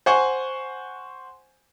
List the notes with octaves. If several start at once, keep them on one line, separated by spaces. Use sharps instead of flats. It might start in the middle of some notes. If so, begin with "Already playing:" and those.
C5 F#5 G#5 C#6